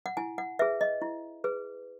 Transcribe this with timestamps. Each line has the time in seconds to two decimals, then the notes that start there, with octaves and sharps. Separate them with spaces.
0.06 F#5
0.17 E4 G#5
0.38 F#5
0.59 G#4 B4 E5
0.81 D#5
1.02 E4
1.44 G#4 B4